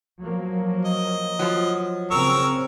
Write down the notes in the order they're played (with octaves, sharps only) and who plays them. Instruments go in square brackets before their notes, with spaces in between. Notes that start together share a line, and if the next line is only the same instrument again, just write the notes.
[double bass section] F3 F#3 A#3
[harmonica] D#5
[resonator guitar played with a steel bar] F3 F#3
[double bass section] C#3 C4 [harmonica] A#4 C#6 E6